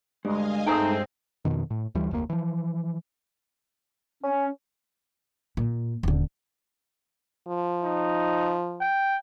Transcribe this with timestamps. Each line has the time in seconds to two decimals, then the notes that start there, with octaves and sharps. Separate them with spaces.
0.25 D2 G2 G#3 D#5 F5 G#5
0.67 G2 G#3 A3 D#4 G#4 C5 G5
1.45 F2 B2 D#3
1.70 A2
1.95 D2 E3 G3
2.11 F1 D2 B2 A#3
2.30 E3 F3
4.24 C#4
5.57 A#2
6.03 D#1 D3
7.48 F3
7.83 D#4
8.81 G5